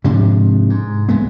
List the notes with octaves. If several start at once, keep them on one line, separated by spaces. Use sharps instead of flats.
G#2 C3 F3 D4
G#2
B1 G#3 B3